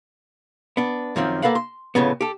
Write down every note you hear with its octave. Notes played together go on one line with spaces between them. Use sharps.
B3 D4
F#2 D#3 F3 C4
A#3 A4 B4 F5 F#5
C6
F2 A2 C#3 B3
G4 A4